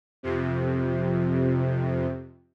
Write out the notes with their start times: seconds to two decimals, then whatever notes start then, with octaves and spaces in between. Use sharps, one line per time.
0.23 F2 C3